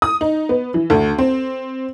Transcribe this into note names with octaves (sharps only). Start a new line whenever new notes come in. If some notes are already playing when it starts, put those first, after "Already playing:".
D#6
D#4
B3
E3
D2
C4